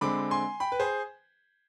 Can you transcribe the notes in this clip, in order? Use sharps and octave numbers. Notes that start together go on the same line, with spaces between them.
D3 G#3 C4 B5 D6
G#5 C6
G5 B5
B4
G#4 C5